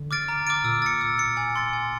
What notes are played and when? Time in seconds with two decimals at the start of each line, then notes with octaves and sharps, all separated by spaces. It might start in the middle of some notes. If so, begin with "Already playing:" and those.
Already playing: D3
0.11 D6 F6 A6 D7
0.28 A#5
0.47 D6 F6 A6 D7
0.64 A#2 E6
0.82 A6 C#7
1.01 E6
1.18 A6 C#7
1.37 G#5
1.56 C6 E6 A6
1.73 G#5